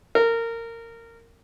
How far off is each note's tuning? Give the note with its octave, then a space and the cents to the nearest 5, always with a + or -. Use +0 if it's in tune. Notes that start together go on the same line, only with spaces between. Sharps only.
A#4 -20